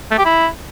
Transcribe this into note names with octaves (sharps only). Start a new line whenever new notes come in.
A3
G4
E4